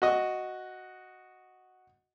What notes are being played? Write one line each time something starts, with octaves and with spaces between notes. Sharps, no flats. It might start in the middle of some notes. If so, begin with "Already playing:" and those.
F#4 D#5